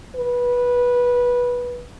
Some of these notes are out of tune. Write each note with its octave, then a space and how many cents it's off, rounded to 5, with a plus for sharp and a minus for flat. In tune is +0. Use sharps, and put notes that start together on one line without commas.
B4 -15